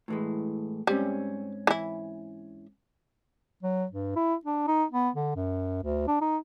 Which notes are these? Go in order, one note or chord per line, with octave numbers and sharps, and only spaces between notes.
A2 E3 G#3
G#2 G3 C4 C#4
E3 E4
F#3
G2
E4
D4
D#4
B3
D3
F#2
D2
D4
D#4